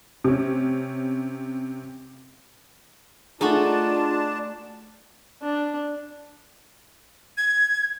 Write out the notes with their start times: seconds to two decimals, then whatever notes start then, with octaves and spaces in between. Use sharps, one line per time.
0.24 C3 C#4
3.41 A3 D4 D#4 F4 F#4 G#4 A5
5.42 D4
7.37 G#6